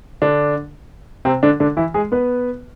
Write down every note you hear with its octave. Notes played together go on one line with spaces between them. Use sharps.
D3 D4
C3 C4
D3 D4
D3 D4
E3 E4
G#3 G#4
B3 B4